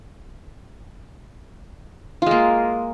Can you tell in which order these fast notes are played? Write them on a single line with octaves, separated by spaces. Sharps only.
F4 G#3 A#3